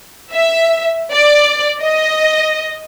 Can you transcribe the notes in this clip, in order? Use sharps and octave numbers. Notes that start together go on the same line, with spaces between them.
E5
D5
D#5